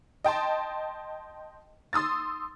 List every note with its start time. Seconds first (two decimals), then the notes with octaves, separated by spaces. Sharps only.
0.24 D#5 G5 A5 C6
1.93 C6 D#6 E6 A6